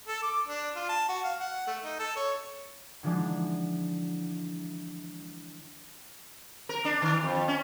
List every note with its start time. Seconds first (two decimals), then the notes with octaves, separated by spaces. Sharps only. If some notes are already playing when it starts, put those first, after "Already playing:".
0.07 A4
0.22 D6
0.47 D4
0.76 F4
0.89 A5
1.09 F#4
1.24 F5
1.40 F#5
1.67 A3
1.84 D#4
1.99 A4
2.16 C#5
3.03 D3 E3 F3 G#3 D4 D#4
6.69 A#4
6.85 D4
7.02 D#3
7.23 F2
7.48 C#4